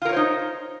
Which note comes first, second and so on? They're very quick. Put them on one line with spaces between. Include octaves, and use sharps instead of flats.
F4 A#4 C#5 C5 D#4